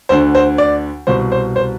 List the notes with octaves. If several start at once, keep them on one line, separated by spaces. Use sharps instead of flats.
D2 D3 C5
C5
D5
C2 B2 C5
C5
C5